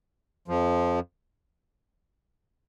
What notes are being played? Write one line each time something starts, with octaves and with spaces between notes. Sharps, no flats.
F2 F3